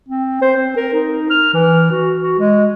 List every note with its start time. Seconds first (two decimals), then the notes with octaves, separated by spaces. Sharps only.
0.08 C4
0.41 C5
0.56 C4
0.76 A#4
0.93 D#4
1.30 F6
1.53 E3
1.91 F#4
2.21 F#4
2.39 G#3